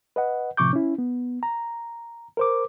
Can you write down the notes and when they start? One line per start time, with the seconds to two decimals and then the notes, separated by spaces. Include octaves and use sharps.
0.16 B4 D#5 F#5
0.57 A2 C3 F3 C#6 D6 G6
0.73 C#4 E4
0.98 B3
1.43 A#5
2.37 A#4 C5 D6